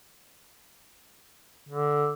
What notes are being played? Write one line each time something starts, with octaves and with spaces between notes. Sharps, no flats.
D3